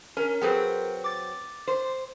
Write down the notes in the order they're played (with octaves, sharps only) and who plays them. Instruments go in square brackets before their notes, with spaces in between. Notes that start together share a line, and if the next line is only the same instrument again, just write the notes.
[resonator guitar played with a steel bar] C#4 [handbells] A#4
[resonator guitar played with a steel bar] F#3 C4 [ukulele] G4 G#4 B4
[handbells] D6 A6
[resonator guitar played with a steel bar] C5